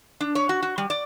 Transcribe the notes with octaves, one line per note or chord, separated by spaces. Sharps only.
D4
C#5
F#4
F#4
G3
D5